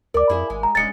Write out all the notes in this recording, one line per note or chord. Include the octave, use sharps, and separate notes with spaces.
D2 A#4 D5 D6
F2 E4 G#4
G#1 G#3
A#5
D#1 G2 G#3 C#4 A6 C#7